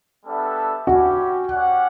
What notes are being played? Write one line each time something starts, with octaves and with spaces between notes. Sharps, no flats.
G3 B3 D4 A4 E5
C#4 E4 F#4 G4
C#4 G4 D5 F#5